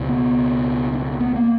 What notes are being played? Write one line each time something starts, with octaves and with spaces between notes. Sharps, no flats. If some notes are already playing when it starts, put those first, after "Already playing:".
Already playing: C#2 B2
B3
B3
A#3